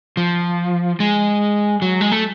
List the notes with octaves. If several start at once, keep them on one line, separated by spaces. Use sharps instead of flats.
F3
G#3
F#3
G#3
A3